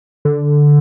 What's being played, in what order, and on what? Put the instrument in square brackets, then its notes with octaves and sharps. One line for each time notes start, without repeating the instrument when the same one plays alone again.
[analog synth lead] D3